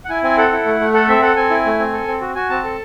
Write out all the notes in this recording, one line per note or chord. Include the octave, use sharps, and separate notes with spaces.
F#5
E4 G#5
C4 G#5
A4 F#5
E4
A3
A3
A4 F#5
C4 E5
A4 F#5
C4 G#5
E4
A3
C4
A4
C4
F#4
F#4 G#5
C4 A5
A4